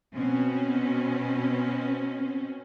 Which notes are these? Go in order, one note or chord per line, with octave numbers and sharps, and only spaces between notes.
B2 C4 C#4